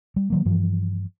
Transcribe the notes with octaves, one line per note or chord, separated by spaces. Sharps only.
G3
D#3 F#3 A#3
G2 E3 F3